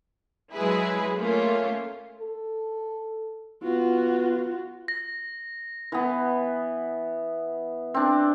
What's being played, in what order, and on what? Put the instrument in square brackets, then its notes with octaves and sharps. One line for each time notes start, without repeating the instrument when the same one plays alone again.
[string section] F#3 G#3 E4 G#4 B4
A3 A#3 C#4 F4
[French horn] A4
[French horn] B3 [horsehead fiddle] F4 F#4
[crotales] A#6
[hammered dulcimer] E3 B3
C4 D4